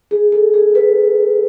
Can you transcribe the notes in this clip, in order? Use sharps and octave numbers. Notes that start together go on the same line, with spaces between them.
G#4
A4
G#4
B4